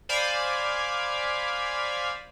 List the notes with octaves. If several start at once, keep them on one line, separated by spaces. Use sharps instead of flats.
C5 D5 F5 G#5 B5